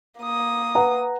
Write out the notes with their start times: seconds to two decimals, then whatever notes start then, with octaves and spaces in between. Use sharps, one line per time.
0.20 A#3 D#6
0.75 B4 F#5 A#5